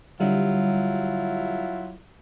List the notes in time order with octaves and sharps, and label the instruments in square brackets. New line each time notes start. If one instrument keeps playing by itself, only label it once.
[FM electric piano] D3 G3 [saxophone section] F#3 E4 F4